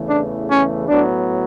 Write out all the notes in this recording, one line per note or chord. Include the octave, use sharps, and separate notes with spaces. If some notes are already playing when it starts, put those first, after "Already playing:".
Already playing: E2 C#3 E3 A3
D4
C#4
A2 F#3 B3 D4